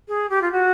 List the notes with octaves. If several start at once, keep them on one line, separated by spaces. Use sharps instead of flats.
G#4
G4
F4
F#4